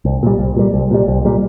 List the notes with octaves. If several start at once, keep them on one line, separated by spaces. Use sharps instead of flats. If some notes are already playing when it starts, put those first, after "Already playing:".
C2
A#2 G3
C2
A#2 G3
C2
A#2 G3
C2
A#2 G3